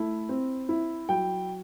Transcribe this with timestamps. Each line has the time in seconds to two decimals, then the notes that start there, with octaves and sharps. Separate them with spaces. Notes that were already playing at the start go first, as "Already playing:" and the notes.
Already playing: A3 E4
0.29 C4
0.69 E4
1.09 F#3 G5